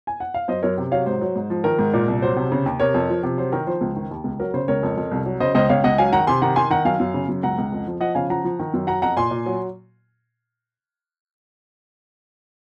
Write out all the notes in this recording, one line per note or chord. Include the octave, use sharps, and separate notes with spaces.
G#5
F#5
F5
F#2 C5 D#5
F#2 A#4 C#5
C3
F#3 C#5 F5
G#2 C5
F#3
G#2
F3
D#3 A#4
G#2
A#2
C2
F#3 C5
C3
C#3
D#2
C3 A#4 C#5
F2
F3
C3
F#3 C5
D#3 A#4
F3 C5
C#2
D#3
D#2
C#2
F#3 A#4
C#3 C5
C#2 A#4 C#5
F2
F2
C2
F#3
C#3 C5 D#5
C#2 C5 D#5
C#2 C#5 F5
C#2 D#5 F#5
F#3 F5 G#5
D#3 F#5 A#5
C3 G#5 C6
D#3 F#5 A#5
D#3 G#5 C6
D#3 F#5 A#5
F#2 F5 G#5
F#2
C#3
F#2
C#2 F#5 A#5
C#2
F2
F3
F3 D#5 F#5
C#3 F5 G#5
F3 F#5 A#5
F3
D#3
F#2
F#3 F#5 A#5
F2 F#5 A#5
A#2 G#5 C6
A#2
F#3